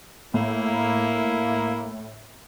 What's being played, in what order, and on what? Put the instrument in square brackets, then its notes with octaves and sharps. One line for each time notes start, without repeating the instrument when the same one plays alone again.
[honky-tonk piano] A2 [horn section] A#3 E4